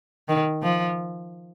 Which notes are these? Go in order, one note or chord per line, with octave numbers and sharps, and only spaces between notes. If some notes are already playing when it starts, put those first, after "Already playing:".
D#3
F3